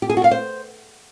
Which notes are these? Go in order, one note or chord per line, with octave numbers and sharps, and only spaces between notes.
G4
G#4
F#4
F5
C5